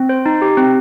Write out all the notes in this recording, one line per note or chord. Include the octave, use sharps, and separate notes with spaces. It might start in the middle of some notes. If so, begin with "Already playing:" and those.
Already playing: C4
C5
D#4
G4
C4